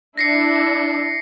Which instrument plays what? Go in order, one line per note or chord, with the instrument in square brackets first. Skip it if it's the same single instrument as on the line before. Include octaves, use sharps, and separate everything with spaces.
[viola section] D4 E4 [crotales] A#6 C7 C#7